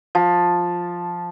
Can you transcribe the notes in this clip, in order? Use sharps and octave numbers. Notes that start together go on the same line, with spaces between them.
F3